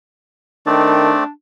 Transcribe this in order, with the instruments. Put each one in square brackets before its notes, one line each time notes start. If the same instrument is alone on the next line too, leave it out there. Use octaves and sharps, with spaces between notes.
[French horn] D#3 [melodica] A3 C4 D5 [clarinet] D4